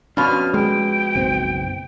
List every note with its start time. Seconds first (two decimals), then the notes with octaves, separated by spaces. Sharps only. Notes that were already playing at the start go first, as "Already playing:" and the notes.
0.17 F2 B2 C#4 D4 F6
0.54 G#3 G5
1.15 F#1 B1 C4